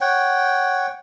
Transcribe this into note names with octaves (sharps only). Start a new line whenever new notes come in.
C#5 F#5 G5